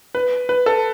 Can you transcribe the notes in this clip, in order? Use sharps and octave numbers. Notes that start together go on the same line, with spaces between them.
B4
B4
A4